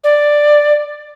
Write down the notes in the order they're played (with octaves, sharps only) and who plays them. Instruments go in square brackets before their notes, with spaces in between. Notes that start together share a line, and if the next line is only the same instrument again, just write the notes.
[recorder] D5